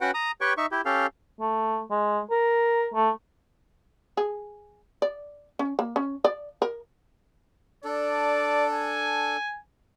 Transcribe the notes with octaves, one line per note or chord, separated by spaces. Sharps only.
C#4 F#4 B4 F#5 G5
A#5 D#6
G4 B4 C#5 G5 C#6
D#4 E5 C#6
E4 G4
C#4 G4 A4 F5
A3
G#3
A#4
A3
G#4
D5
C#4
A#3
C#4
D5
A#4
D4 A4 D5
G#5